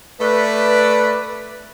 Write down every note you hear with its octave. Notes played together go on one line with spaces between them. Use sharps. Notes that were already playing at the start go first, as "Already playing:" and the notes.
A3 B4 D5